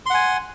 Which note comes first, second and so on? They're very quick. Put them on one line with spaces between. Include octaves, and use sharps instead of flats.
C6 F#5 G#5